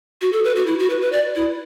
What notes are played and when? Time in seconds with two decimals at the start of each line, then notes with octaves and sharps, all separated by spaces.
0.22 F#4
0.33 A4
0.45 B4
0.56 F#4
0.67 E4
0.79 F#4
0.90 B4
1.01 B4
1.12 D5
1.35 E4